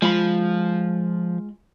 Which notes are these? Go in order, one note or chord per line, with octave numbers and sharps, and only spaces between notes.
F3 G#3 F4 B5